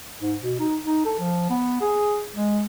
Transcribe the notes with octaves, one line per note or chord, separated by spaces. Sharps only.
G#2
B2
D#4
D#4
A4
F3
B3
G#4
G#3